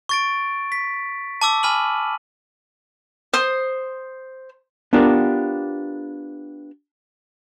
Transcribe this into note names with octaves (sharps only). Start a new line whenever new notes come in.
C#6 A6 D7
B6
A5 D6 E6
G#5 B5 F6 D#7 F#7
C5 D#6
B3 D4 F4 G4 A#4